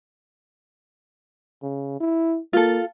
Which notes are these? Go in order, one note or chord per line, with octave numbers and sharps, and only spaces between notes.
C#3
E4
A#3 F4 A4